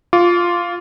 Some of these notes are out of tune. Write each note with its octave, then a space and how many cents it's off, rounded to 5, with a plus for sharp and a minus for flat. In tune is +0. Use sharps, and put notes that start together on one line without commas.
F4 +0 D6 -30